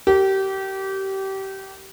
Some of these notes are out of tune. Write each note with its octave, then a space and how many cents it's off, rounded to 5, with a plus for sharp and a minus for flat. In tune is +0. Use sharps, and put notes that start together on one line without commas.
G4 -25 A#4 -30